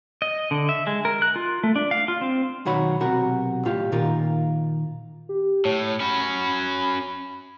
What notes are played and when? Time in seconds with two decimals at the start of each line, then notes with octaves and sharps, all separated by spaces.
0.22 D#5
0.51 D3
0.69 E5
0.87 G#3
1.05 A#4
1.22 F#6
1.36 F4
1.63 A3
1.76 D4
1.91 F5
2.08 F4
2.21 C4
2.65 B1 D#3 F#4 C#5 B5
3.00 B1 C3 F#4 A#4
3.65 A2 F4 G4
3.92 A#2 D#3 F4 A#4
5.29 G4
5.65 A2 C#5
6.00 C#4 F#4 B5